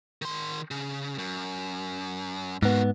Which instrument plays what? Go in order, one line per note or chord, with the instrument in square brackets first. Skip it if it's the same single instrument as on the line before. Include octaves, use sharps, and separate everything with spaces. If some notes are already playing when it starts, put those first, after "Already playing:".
[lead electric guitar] D#3 C6
C#3
F#2
[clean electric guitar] G#2 B3 [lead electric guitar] A#3 F#4